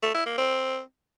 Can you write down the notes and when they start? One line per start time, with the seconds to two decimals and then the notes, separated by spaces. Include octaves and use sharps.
0.03 A3
0.14 E4
0.26 A#3
0.38 C4